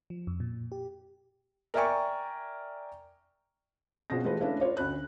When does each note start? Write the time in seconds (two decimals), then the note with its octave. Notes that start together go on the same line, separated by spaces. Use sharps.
0.10 F3
0.27 F2
0.40 A#2
0.72 G4
1.74 A#4 D5 E5 G5 G#5 C#6
4.10 B2 C4 C#4 F4 G#4 A#6
4.24 E3 G#3 A3 F4 G4 B4
4.40 A3 C#4 D4 E4 B4 F5
4.60 F4 B4 C#5 D5
4.77 D2 C#4 B5 F#6